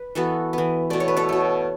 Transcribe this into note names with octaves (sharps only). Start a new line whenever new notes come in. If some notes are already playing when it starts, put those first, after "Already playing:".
Already playing: B4
E3 B3 F#4 A4
E3 B3
B2 A3 D5
C#5
B4
A4 C#5
B2 A3